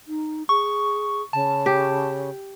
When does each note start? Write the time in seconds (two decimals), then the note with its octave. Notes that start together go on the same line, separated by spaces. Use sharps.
0.08 D#4
0.49 G#4 C#6
1.33 C#3 A5
1.66 G4